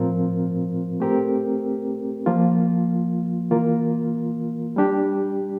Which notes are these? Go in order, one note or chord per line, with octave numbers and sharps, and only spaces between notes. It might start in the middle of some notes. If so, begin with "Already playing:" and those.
Already playing: A2 F3 C4 F4 A#4
A3 C4 G4 A#4
F3 A#3 F4
E3 A#3 F4 A#4
G3 D4 G4